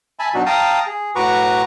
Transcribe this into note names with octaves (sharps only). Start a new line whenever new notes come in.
E5 G#5 A5 B5
B2 F#3 D4 D#4 F#4
F5 G5 A5 A#5 D#6
G#4
A2 F#4 B4 A#5 C#6 D6